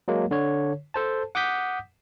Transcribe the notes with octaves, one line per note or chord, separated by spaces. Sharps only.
F#3 G#3 A#3
D3 C#5
A4 C5 A5
F#5 D6 D#6 G6 B6